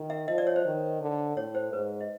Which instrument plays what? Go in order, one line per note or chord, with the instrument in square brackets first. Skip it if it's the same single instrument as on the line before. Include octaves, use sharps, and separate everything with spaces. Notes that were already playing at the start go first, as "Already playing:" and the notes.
Already playing: [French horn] D#3
[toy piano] E5
[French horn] F3 [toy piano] D#5
[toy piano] D5
C#5
C5
[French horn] D#3
D3
[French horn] A2 [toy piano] C#5
[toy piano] C5
[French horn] G#2 [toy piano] B4
[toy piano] D#5